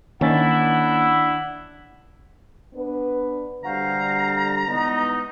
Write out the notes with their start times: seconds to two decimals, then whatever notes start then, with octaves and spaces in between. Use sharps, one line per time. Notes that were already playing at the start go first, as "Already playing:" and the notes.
0.21 D#3 A#3 C#4 D4 E4 F#5 A6
2.74 B3 D4 B4
3.64 D3 G3 F#4 C5 F5 A#5
4.67 E3 G#3 B3 D#4